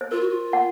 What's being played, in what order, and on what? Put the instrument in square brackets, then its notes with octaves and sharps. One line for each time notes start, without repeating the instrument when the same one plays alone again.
[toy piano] C5
[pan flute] F4 [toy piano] A#4
[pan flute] F#4
F4
[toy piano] F#5